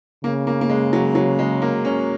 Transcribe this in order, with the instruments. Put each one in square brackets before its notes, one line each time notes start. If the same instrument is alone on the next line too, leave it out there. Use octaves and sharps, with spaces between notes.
[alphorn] C#3 [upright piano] A#3
[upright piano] A#3
A#3
G#3
F#3
F#3
G#3
A#3
C#4